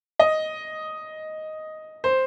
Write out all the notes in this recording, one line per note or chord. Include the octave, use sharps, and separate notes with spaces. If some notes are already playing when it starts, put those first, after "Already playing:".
D#5
C5